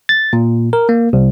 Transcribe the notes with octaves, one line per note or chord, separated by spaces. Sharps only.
A6
A#2
A#4
A#3
C2